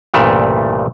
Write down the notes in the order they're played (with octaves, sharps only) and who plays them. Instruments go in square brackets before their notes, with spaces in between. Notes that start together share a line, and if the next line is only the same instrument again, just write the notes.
[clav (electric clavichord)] C2 G2 A#2 C#3 E3 A3